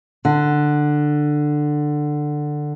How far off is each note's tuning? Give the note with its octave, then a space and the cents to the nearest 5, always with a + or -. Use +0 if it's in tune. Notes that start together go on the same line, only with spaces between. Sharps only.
D3 +15